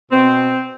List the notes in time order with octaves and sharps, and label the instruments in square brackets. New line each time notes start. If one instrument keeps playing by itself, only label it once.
[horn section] B2 C4